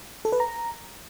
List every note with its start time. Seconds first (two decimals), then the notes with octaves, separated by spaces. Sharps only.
0.25 A4
0.32 B4
0.40 A#5